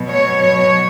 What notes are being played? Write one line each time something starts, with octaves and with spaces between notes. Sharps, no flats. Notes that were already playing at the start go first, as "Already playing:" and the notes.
Already playing: B2 F#3
C#5
C#5